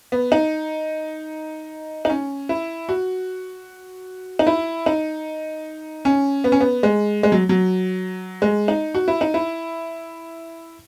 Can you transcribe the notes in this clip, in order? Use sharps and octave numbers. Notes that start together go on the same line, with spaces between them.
B3
D#4
D#4
C#4
E4
F#4
D#4
E4
D#4
C#4
B3
C#4
B3
G#3
G#3
F#3
F#3
G#3
D#4
F#4
E4
D#4
E4